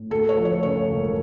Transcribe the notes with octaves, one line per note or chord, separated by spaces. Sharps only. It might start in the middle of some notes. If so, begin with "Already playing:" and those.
Already playing: A2
D2 A4
C#5
F3
C#5
C#3 C#5
E1